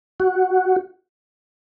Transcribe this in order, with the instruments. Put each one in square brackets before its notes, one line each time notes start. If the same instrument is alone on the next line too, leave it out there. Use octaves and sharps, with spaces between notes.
[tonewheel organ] F#4